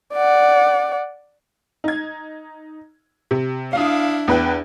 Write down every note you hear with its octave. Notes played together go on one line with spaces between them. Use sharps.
D5 F#5
D#4 G#6
C3
D4 E4 F5 D#6
E2 B4 G5